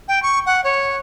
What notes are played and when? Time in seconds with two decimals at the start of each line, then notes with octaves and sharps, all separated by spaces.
0.08 G5
0.23 C#6
0.46 F#5
0.64 C#5